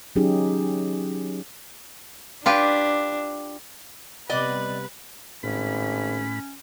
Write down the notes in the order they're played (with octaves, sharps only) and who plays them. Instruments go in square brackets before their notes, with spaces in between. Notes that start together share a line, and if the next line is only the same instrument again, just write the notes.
[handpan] F#3 C#4 D#4 G4 G#4
[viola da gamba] D4 [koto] F4 G4 B4
[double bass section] C3 G3 B3 [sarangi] B4 [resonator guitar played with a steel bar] D5 D#5
[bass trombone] G#1 [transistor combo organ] A2 B5 [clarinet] C#4